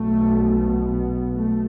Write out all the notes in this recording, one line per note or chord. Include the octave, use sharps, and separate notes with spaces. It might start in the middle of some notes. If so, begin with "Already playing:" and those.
Already playing: B1 B2 A3
B3
A3